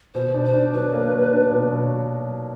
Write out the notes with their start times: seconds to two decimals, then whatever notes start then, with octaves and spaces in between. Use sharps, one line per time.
0.14 B2 C5
0.34 D4
0.45 C5
0.53 D4
0.73 F#3 B4
0.93 A#3
1.13 F#3
1.32 D4
1.51 B2
1.71 F#3
1.91 F#3